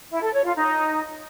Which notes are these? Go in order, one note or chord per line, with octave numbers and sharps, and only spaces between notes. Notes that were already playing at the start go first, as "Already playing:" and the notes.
E4
A4
C#5
F4
D#4